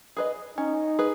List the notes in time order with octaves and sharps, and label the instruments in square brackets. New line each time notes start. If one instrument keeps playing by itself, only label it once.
[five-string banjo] G#4 B4 D#5
[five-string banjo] C#4 [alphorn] D#4
[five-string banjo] G#4 B4